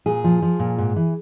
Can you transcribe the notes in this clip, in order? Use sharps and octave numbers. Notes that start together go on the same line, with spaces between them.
A#2 G#4
F3
F3
A#2
G#2
E3